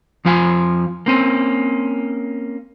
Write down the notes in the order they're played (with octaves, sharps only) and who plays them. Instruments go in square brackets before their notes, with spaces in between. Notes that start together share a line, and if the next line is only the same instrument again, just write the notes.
[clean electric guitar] F2 F3 F4 F5 G#5
A#3 C4 C#4